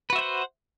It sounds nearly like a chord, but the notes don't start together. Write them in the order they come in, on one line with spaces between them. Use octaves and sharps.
B4 F#4 E5 C5 F#5